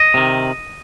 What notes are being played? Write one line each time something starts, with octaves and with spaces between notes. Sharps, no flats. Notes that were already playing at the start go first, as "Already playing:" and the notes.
Already playing: D#5
C3 D#3